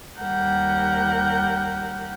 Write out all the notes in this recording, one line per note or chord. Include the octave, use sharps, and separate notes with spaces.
D#2 G3 A#4 F#5 G6